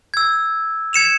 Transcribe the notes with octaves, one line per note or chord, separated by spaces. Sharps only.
E6 G#6
G#6 C#7 E7 F7